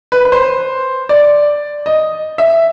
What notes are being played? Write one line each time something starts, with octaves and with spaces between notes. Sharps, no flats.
B4
B4
C5
D5
D#5
E5